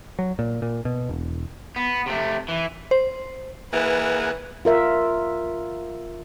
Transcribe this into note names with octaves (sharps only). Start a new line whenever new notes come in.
F#3
A#2
A#2
B2
E1
B3
C3 A3
E3
C5
E3 A#3 G#4 B4 F#5
F4 A#4 E5